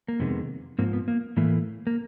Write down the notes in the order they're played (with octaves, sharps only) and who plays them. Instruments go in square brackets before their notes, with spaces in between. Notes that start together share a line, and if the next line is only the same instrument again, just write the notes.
[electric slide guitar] A#3
F2 C3 D#3 G#3 B3
G#2 F3 A#3 C4
B3
A#3
A2 E3 A3 A#3
A#3